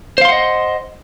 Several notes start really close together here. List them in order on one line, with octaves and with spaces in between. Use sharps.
C5 F5 C6 F#5 D#5